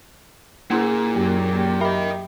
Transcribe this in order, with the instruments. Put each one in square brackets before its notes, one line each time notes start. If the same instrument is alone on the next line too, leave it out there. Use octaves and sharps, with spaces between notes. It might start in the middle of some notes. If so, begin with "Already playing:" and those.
[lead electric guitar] A#2 [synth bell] A#3 E4 G#4
[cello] F#2 F#3 [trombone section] G4
[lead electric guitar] A#4 D#5 [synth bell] E5 B5